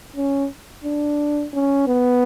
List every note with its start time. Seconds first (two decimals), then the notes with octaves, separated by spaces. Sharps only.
0.16 C#4
0.84 D4
1.53 C#4
1.88 B3